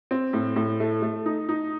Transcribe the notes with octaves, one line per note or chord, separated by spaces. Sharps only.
C4
A2
A2
A3
A3
D#4
D#4